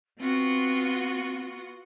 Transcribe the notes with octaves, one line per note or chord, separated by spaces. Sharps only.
B3 C4 F4 F#4